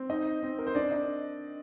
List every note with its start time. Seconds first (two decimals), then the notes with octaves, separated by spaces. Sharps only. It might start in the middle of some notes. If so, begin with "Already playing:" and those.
Already playing: C4
0.10 D#4 D#5
0.43 C4
0.58 A#4
0.67 C5
0.75 D4 D5
0.91 D#5